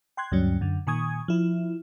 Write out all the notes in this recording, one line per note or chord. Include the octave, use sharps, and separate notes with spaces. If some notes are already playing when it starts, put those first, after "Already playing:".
G5 C6 F#6 G#6
D2 G2 F#3 C#4
F#2 D3
A#2 D#3 G#5 C#6 D#6 G#6
F3 E4